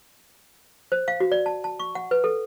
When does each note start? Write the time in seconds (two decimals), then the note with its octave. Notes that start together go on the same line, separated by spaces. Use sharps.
0.92 C5
1.08 F5
1.20 F#4
1.32 D5
1.46 A5
1.64 A5
1.80 C#6
1.95 F#5
2.11 B4
2.24 A4